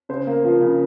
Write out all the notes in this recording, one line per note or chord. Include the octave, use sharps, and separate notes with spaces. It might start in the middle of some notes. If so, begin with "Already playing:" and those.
C#3 C5
A#3
F3
C#3